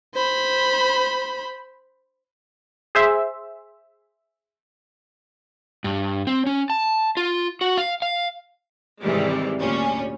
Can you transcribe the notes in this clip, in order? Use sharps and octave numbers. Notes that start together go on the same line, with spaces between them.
C5 B5
G#4 C5 E5
G2
C4
C#4
A5
F4
F#4
F5
F5
G#2 C3 D#3 E3 G3 G#3
D2 A#2 G3 C#4